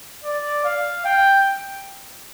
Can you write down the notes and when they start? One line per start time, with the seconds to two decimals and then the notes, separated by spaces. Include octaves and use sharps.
0.24 D5
0.64 F5
1.05 G5